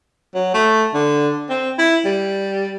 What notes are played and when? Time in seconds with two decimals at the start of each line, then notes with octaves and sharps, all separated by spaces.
0.34 F#3
0.54 A3
0.94 D3
1.49 C4
1.79 E4
2.05 G3